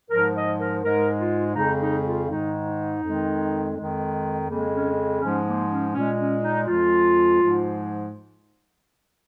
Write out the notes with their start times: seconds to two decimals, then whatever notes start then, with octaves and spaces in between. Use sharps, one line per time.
0.09 G#2 F3 G#3 A#4
0.34 D#5
0.59 A#4
0.83 G#2 G#3 A#4
1.19 F4
1.55 F2 C#3 G#3 D#4
1.80 D#4
2.05 F4
2.29 G#2 D#3 G#3 D#4
2.66 D#4
3.02 F2 D#3 G#3
3.75 F2 D#3 G#3
4.48 F2 C#3 G#3 A#3
4.72 C#4
5.21 G#2 F3 G#3 C#4
5.46 A#3
5.69 C#4
5.94 A#2 G#3 C#4
6.19 C#4
6.43 D#4
6.67 F2 F3 G#3 F4
7.41 G#2 F3 G#3